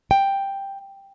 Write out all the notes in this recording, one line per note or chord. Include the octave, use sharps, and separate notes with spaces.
G5